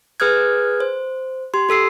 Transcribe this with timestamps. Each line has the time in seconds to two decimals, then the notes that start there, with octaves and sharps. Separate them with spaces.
0.20 G#4 B4 D#6 F6 F#6 G#6
0.80 C5
1.54 G4 C6
1.69 G4 A4 E6 C7